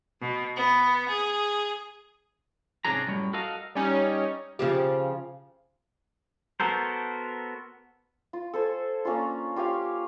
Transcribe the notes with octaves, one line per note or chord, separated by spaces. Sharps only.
B2
B3
G#4
G#2 C3 C#4 D4 G#4 A#5
F#2 A2 G3 C#5
F#4 A4 A#4 D#5 F5
G3 C#4 D#4
C#3 F3 G4
B3 F#4 A4 A#4 C5
F4
A4 C5 G#5
A#3 C#4 D4 F4
F4 G4 C#5 F5